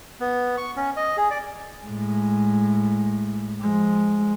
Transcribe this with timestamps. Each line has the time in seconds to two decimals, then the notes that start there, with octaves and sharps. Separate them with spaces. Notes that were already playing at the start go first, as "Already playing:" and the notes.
0.20 B3
0.57 C#6
0.76 C#4
0.97 D#5
1.17 G#4
1.30 D5
1.85 A2 G#3
3.60 F3 G#3